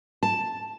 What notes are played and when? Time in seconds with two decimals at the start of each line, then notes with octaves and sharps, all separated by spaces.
0.23 A5